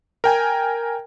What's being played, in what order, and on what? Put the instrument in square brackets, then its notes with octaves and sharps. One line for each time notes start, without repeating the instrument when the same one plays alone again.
[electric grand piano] A#4 G5 G#5